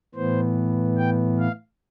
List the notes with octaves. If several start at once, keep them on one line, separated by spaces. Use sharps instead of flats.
A2 E3 B3 C5
G5
F5